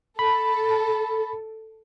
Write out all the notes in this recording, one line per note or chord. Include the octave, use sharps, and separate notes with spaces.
A4 B5